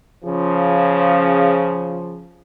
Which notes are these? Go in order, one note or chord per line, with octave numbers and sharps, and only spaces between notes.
C#3 F3